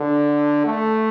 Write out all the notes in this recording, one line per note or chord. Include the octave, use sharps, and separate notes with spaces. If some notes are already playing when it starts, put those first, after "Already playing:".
Already playing: D3
A3